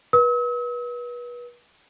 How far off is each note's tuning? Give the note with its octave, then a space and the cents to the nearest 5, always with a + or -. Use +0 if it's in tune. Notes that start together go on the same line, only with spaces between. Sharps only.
B4 -30 E6 -45